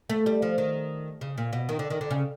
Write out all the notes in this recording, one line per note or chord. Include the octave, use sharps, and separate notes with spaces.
A3
G3
F3
D#3
C#3
A#2
B2
D#3
D3
D#3
D3
C#3